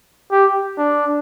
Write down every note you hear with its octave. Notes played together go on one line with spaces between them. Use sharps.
G4
D4